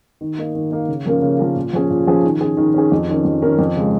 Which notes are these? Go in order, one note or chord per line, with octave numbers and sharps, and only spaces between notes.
D#3
A#3 D#4
D#3
A#3 D#4
C#3
F3 A#3 C#4 A#4
C#3
F3 A#3 C#4 A#4
A#2
F3 C#4 G#4
A#2
F3 C#4 G#4
D#3
C#4 G#4
D#3
C#4 G#4
F2
D#3 C#4 A#4
F2
D#3 C#4 A#4
F2
C#3 G#3